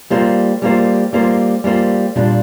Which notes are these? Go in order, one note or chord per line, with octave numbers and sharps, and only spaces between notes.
G3 A#3 F4 C5
G3 A#3 F4 C5
G3 A#3 F4 C5
G3 A#3 F4 C5
A#2 G3 D4 F4